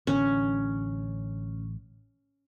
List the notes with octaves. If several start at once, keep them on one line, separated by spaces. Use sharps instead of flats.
A1 D3 C#4